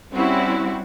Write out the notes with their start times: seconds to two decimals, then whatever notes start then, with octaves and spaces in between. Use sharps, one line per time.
0.12 G3 C4 C#4 E4 F#4 G4